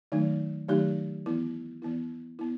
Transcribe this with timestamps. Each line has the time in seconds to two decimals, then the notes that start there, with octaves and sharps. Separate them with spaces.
0.12 D#3 F#3 A3 D#4
0.68 D#3 F#3 A3 D#4 G4
1.26 E3 B3 E4
1.82 E3 B3 E4
2.39 B3 E4